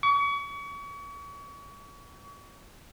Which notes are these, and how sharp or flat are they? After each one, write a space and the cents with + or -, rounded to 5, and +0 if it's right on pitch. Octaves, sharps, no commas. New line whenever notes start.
C#6 +35